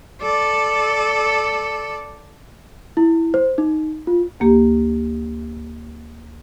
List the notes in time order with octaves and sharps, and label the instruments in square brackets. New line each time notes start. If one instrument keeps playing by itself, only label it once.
[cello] A4 D5
[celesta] E4
C5
D#4
F4
[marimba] D2 A#3 G4